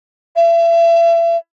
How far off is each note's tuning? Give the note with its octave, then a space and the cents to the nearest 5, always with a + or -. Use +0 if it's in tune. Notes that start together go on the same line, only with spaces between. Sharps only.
E5 +35